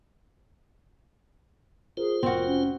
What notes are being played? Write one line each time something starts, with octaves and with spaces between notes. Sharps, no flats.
F4 G#4 A#4 C5
F1 C4 F#4 A#4
C#4